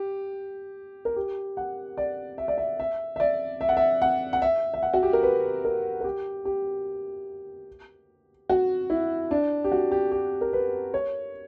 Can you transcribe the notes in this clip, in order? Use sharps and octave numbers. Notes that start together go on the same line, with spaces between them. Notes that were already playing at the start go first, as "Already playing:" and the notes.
Already playing: G4
A#4
G4
F#5
D5
E5
D5
E5
E5
E5
D5
E5
F#5
E5
F#5
F#5
E5
E5
F#5
F#4
G4
A#4
B4
A#4
A#4
G4
G4
F#4
E4
D4
G4
F#4
G4
G4
A#4
B4
C#5